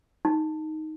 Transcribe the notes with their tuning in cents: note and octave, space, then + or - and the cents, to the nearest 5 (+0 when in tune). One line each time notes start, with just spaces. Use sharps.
D#4 +5